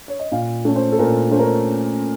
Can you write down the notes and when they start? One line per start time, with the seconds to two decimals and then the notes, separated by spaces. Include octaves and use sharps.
0.08 C#5
0.19 D#5
0.32 A#2 F5
0.65 A3 C#4
0.76 C5
0.92 A4
0.99 A#2 A#4
1.31 A3 C5
1.34 C#4 A#4